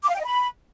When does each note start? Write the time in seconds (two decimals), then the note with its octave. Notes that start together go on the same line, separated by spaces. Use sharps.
0.04 D6
0.09 F5
0.14 G5
0.20 D#5
0.25 B5